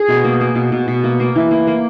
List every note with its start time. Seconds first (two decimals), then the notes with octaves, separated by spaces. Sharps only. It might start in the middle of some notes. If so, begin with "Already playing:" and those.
Already playing: G#4
0.08 B2
0.24 A#3
0.41 A#3
0.55 B2
0.72 B2
0.88 B2
1.04 A#3
1.20 A#3
1.36 E3
1.51 A#3
1.67 A#3